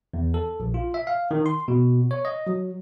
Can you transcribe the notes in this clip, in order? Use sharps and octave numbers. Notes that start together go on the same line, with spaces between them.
E2
A4
A#1
F4
E5
F5
D#3
C6
B2
C#5
D#5
F#3